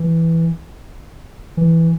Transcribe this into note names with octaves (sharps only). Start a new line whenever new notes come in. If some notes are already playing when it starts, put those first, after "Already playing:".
Already playing: E3
E3